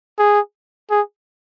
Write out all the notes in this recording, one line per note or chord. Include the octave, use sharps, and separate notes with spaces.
G#4
G#4